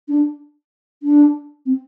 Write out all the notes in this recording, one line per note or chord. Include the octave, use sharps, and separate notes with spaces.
D4
D4
C4